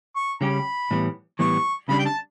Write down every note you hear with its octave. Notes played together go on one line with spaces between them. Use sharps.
C#6
C#3 G3 C#4 G4 B5
A2 E3 G3 B3
A2 E3 G3 B3 C#6
C#3 G3 D4 B5
G5
A5